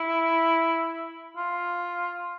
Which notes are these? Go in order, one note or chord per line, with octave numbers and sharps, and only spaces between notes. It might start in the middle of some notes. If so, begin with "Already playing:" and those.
Already playing: E4
F4